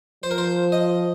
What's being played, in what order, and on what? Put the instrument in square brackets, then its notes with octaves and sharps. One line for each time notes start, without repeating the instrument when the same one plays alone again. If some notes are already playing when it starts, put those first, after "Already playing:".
[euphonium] F3 [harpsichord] C5
[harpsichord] A#4
C5
D#5